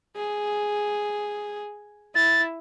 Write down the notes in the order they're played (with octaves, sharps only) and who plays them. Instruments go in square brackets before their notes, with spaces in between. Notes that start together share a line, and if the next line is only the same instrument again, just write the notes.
[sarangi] G#4
[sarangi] E4 [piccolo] A6